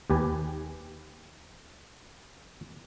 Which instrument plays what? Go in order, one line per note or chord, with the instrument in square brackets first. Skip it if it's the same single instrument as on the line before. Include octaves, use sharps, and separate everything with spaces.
[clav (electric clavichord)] D#2 G4 B4 G#5